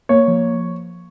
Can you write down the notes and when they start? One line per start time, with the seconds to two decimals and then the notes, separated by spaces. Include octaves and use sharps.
0.09 A#3 C#5
0.28 F3